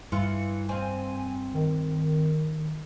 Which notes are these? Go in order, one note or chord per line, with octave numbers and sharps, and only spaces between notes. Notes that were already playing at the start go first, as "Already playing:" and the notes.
G2 E3 F4 C#7
C4 F5 G#5
D#3